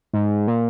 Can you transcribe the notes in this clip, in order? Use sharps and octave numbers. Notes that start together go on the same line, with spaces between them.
G#2
A#2